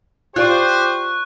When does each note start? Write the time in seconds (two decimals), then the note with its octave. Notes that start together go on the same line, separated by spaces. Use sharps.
0.36 F4 G4 C5 D5 C#6 F#6